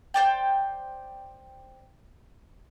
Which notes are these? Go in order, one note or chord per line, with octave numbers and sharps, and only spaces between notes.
C5 D5 G5